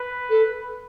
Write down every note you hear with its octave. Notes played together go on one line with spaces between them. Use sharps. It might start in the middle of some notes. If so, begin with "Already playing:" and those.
Already playing: B4
A4